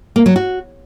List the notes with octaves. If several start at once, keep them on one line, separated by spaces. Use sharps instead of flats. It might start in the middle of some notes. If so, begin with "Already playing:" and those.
A#3
F#3
F#4